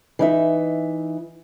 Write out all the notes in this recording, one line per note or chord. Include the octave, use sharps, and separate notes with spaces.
E3 D#4 E5